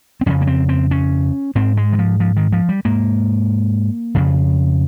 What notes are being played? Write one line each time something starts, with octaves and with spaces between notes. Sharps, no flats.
C4
F2 C#3 C#4
A#3
C4
C4
C#4
G#2 C4
G#3
D#3
F3
F3
D#3
F3
G3
G#2 A#3
F2 C#3